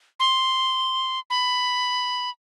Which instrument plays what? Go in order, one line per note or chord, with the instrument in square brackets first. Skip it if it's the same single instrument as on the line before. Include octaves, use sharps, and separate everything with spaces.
[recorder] C6
B5